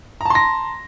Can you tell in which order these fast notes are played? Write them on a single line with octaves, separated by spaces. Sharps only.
A#5 A5 C6 A#6